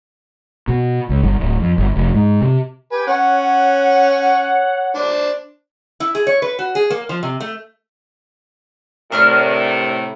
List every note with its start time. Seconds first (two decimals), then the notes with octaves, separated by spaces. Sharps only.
0.68 B2
1.09 C#2
1.23 G1
1.40 D1
1.59 F2
1.78 G1
1.96 F1
2.15 G#2
2.41 C3
2.92 G4 B4 G5 G#5
3.07 C#4 C#5 F#5
4.95 D4 C5
6.00 E4
6.15 G#4
6.27 C#5
6.42 B4
6.59 F#4
6.75 G#4
6.90 A#3
7.09 F3
7.23 C3
7.40 A3
9.12 A2 C3 A3 D4 A#4 F6